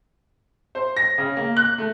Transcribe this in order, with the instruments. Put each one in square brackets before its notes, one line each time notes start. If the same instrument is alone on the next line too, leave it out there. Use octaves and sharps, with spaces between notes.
[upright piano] C5
A#6
C#3
A#3
F#6
A3